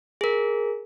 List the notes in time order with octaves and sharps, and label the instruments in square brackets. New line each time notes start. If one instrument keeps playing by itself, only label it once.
[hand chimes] G#4 A#4